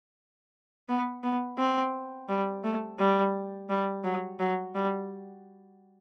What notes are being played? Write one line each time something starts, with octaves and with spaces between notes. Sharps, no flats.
B3
B3
C4
G3
A3
G3
G3
F#3
F#3
G3